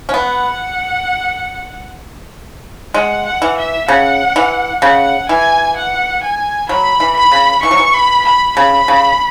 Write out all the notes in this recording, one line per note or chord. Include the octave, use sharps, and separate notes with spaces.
C#4
B3 F#5
G#3 F#5
F#5
E3
E5
C#3 F#5
E3
C#3 F#5
E3 G#5
F#5
G#5
F#3 B5
E3
B5
C#3
E3 C#6
F#3
E3
B5
B5
C#3 B5
C#3